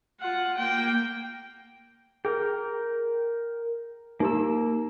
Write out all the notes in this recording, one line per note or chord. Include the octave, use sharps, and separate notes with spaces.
F4 F#5
A#3 G5
G#4 A#4 G5
A#3 D#4 G4 A#5 E6